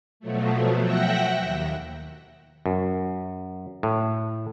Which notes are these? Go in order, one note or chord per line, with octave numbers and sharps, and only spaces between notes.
B2 F3 F#3 A3
E5 F#5 G5 E6 F#6 A#6
D#2
F#2
A2